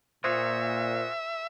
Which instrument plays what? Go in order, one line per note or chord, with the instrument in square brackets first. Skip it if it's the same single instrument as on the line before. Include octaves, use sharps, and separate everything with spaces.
[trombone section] A#2 [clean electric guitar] F4 F#4 G#4 [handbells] C5 [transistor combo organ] E5